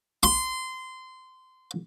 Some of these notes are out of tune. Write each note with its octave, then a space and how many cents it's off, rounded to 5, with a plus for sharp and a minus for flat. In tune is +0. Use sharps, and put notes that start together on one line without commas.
C6 -20